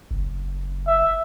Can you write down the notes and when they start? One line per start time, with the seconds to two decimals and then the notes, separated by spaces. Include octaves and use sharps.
0.11 F#1
0.87 E5